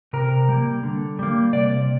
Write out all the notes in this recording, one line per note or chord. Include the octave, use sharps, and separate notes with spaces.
C3 A#4
G3 A#3
D3
G3 A#3
C3 D5